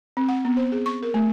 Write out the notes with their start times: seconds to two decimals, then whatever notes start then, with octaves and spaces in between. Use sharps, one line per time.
0.17 C4
0.29 F#5
0.45 B3
0.57 C5
0.72 G#4
0.86 C#6
1.02 A#4
1.14 A3